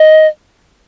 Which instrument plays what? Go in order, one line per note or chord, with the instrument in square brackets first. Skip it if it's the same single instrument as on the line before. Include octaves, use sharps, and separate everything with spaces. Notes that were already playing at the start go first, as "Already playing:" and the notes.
Already playing: [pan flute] D#5